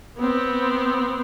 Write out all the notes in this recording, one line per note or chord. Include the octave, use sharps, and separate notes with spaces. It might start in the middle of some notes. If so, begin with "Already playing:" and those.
B3 C4